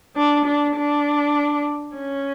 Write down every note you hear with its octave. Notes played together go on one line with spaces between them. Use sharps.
D4
D4
D4
C#4